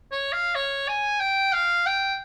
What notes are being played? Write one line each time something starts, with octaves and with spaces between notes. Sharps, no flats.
C#5
F5
C#5
G#5
G5
F5
G5